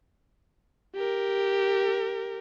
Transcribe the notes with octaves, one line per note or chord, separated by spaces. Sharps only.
G4 A#4